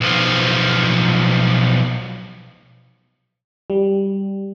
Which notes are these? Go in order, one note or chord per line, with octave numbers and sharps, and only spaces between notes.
B1 F3
G3